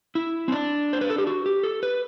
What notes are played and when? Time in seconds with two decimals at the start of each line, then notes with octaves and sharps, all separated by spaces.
0.15 E4
0.48 C4
0.52 D4
0.93 C5
1.01 B4
1.10 A4
1.18 G4
1.27 F#4
1.46 G4
1.64 A4
1.83 B4